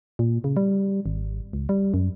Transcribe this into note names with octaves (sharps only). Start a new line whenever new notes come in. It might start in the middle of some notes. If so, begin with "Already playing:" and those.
A#2
C#3
G3
G#1
C#2
G3
F#2